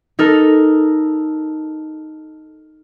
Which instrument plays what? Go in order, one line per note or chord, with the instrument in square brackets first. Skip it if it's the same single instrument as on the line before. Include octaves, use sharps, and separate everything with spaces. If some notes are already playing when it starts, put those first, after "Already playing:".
[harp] D#4 A4 A#4